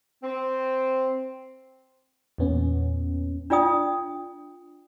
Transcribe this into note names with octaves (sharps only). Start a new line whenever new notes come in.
C4
E2 A#2 B3 C#4
D4 F4 D5 G5 D#6